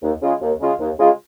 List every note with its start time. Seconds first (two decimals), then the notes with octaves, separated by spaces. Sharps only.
0.03 D#2
0.22 C#3 G#3 F4
0.41 D#2
0.60 C#3 G#3 F4
0.80 D#2
0.99 C#3 G#3 F4